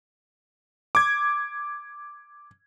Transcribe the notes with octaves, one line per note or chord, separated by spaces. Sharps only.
D6 G#6